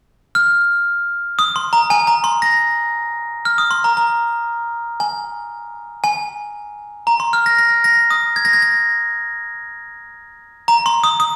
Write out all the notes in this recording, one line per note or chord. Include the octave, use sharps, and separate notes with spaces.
F6
D#6
C6
A#5
G#5
A#5
C6
A#6
F6
D#6
C6
A#5
A#5
G#5
G#5
A#5
C6
F6
A#6
A#6
A#6
D#6
G#6
A#6
G#6
A#6
A#5
C6
D#6
D#6